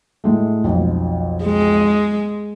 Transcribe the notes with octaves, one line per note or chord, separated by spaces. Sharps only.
A2 G#3 A3
B1 F2
G#3